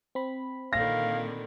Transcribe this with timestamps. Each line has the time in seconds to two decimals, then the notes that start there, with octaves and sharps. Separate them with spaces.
0.15 C4 B5
0.73 A#2 D3 D#3 F5 A#6